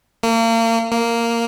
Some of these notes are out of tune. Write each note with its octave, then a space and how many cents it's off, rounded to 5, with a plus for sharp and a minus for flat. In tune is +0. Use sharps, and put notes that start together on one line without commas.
A#3 -35
A#3 -5